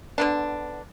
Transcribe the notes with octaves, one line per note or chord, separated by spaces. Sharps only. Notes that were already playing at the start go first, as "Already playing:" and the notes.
D3 B3 D4